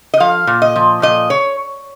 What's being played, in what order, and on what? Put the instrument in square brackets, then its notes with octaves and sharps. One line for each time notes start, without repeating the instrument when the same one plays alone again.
[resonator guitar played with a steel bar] D#5
F3 F5
A#2
D#5
F3
A#2 D#5
C#5